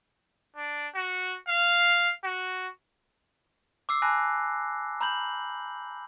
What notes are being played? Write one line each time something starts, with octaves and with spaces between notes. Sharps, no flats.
D4
F#4
F5
F#4
D6 E6 C7
G#5 A5 B5 F#6 A#6
A#5 B5 G6 F#7